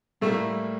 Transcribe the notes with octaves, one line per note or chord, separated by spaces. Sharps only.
A2 G3 A3 A#3 E4